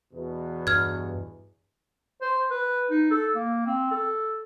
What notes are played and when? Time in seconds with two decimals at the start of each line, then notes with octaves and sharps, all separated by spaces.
0.12 E2 B2
0.67 G2 F6 G#6
2.22 C5
2.51 B4
2.91 D#4
3.11 A4
3.35 A#3
3.66 C4
3.91 A4